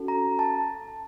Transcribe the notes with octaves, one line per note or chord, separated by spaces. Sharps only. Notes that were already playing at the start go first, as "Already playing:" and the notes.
Already playing: C#4 F#4 A4
A#5
A5